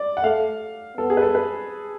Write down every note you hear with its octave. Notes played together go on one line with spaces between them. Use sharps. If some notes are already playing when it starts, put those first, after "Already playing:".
Already playing: D5
F#5
A3 F5
B3 A4
G#4
B4
A4
B4